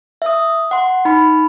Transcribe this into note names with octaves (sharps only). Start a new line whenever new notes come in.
E5 D#6
F#5 C6
D#4 B5